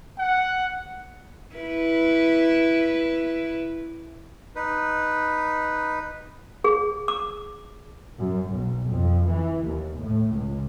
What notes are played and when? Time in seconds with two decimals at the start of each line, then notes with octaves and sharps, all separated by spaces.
0.18 F#5
1.55 E4 B4
4.55 D#4 B4
6.64 G#4
7.08 D6
8.20 F#2
8.51 B1
8.91 F2
9.27 E3
9.64 D#2
10.00 A2
10.34 C#2